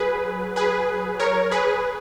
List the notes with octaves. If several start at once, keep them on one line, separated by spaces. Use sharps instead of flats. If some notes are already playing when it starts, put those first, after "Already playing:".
Already playing: F#3 G#4 B4
G#4 B4
A#4 C#5
G#4 B4